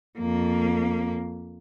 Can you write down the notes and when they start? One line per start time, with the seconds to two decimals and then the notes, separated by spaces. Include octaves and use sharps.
0.19 F2 A#3